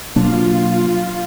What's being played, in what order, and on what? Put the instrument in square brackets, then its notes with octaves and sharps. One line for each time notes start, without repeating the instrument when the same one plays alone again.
[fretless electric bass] B2 F#3 A#3 D4 [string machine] F4